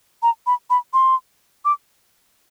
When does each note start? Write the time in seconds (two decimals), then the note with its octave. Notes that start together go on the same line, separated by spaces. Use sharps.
0.23 A#5
0.46 B5
0.70 B5
0.93 C6
1.65 D6